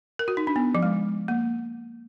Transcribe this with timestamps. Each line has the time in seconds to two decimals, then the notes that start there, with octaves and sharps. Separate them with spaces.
0.19 A#4
0.28 F#4
0.37 D#4
0.47 D4
0.56 B3
0.75 F3
0.83 G#3
1.28 A#3